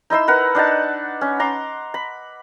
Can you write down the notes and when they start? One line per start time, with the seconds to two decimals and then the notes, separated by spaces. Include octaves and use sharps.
0.10 D#4 E4 C6 E6
0.28 A#4 B4 F#5
0.55 D4 D#4 F#5 A5
1.21 C#4
1.39 A#5 C6 D6
1.94 B5